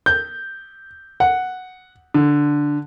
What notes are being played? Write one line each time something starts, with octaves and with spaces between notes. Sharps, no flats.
G6
F#5
D3